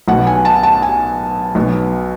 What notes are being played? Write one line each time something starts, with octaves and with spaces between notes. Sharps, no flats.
B1 B2 F#5
G#5
A5
A5
G#5
B1 B2